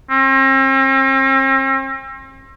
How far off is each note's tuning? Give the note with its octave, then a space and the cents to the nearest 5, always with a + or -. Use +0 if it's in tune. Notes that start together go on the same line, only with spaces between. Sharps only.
C4 +45